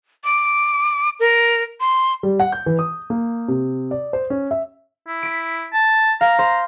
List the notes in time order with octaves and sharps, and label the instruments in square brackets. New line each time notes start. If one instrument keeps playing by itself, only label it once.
[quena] D6
A#4
C6
[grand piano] G3
F#5
G6
E3
D#6
A#3
C3
D5
C5
C#4
E5
[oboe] E4
[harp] B6 D7
[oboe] A5
[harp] F5 [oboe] A#5
[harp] C5